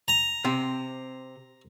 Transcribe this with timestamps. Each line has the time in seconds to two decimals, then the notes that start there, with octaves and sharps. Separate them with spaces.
0.08 A#5
0.45 C3 C4